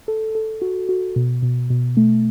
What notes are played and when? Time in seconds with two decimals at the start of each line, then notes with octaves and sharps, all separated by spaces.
0.08 A4
0.35 A4
0.62 F#4
0.89 F#4
1.16 B2
1.42 B2
1.70 B2
1.97 A3